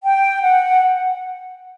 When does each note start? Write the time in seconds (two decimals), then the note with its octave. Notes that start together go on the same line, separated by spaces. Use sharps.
0.03 G5
0.41 F#5